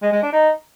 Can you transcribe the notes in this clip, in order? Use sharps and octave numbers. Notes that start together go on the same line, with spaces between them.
G#3
G#3
D4
D#4